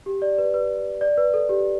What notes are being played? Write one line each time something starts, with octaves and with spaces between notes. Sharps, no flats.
G4
D5
B4
B4
D5
B4
A4
G4